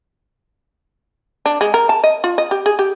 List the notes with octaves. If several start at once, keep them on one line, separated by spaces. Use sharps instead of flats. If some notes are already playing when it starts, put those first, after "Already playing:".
D4
G#3
A#4
A5
D#5
F4
D#5
G4
G#4
G4